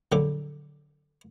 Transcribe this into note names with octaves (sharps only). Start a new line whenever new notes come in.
A#1 D3 F#3 A4 D5